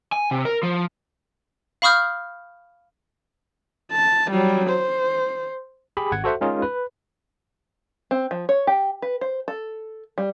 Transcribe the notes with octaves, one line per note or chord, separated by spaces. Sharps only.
G#5
C3
A#4
F3
F5 B5 C#6 D#6 F6 G6
A5
F#3 G3
C5
G4 G#4 B5
G#1 F#5 G#6
F#4 A4 C5 E5 F#5
G#3 C#4 D#4 F4 G#4 A#4
B4
C4
F3
C#5
G4
B4
C5
A4
G3